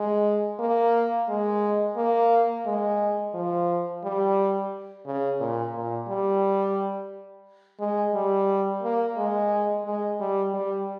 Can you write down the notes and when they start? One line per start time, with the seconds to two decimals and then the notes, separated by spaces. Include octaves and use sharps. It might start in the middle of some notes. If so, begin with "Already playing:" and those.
Already playing: G#3
0.59 A#3
1.29 G#3
1.97 A#3
2.66 G#3
3.34 F3
4.03 G3
5.06 C#3
5.40 A#2
5.74 A#2
6.08 G3
7.80 G#3
8.15 G3
8.83 A#3
9.17 G#3
9.85 G#3
10.20 G3
10.54 G3